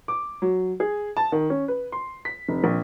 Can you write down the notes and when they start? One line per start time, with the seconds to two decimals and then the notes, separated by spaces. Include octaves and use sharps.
0.08 D6
0.42 F#3
0.80 G#4
1.17 A5
1.32 D#3
1.50 C#4
1.68 B4
1.92 C6
2.25 B6
2.49 F1
2.64 A#1